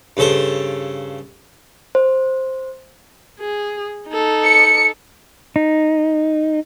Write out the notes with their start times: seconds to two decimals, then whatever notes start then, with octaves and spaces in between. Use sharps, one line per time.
0.17 G2 C#3 A4 C5
1.95 C5
3.39 G#4
4.09 D#4 A4
4.43 C#7
5.56 D#4